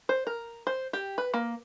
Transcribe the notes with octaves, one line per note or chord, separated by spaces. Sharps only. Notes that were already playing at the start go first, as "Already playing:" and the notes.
C5
A#4
C5
G4
B4
A#3